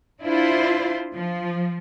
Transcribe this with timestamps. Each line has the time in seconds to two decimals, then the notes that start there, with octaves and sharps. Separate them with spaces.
0.23 D4 E4 F4 C5
1.14 F3